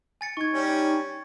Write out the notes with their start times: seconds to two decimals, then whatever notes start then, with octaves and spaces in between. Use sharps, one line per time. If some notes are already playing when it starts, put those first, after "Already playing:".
0.21 G#5 A6 C#7
0.37 D#4 C#6 G#6
0.53 G3 C#4